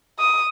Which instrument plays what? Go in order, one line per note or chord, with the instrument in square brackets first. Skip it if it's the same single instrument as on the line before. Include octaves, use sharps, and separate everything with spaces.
[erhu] D#6